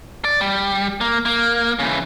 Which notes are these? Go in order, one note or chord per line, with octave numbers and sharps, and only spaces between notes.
D5
G3
A#3
A#3
C#3 E3